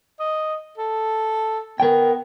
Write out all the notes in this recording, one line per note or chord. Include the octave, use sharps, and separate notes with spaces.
D#5
A4
B3 A#4 G5